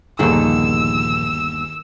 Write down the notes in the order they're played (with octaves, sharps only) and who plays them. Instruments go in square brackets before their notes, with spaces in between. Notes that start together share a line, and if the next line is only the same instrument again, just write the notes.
[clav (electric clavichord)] G1 D#2 [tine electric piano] A#2 F3 [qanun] D#3 G#4 A4 [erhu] E6